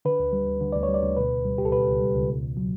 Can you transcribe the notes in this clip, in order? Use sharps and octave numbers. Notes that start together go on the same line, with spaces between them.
D3 B4
D2
G3
D2
D3
D2 D5
C#5
G3
D5
D2
B2 B4
C#2
G3
C#2 G4
A4
B2 B4
C#2
G3
C#2
B2
E2
F#3